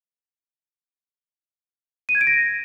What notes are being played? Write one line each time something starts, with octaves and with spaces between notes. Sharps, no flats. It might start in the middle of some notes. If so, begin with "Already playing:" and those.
D#7
G#6
D7
A#6